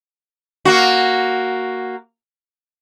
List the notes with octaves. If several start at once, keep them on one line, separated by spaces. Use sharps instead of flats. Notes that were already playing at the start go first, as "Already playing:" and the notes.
A#3 F#4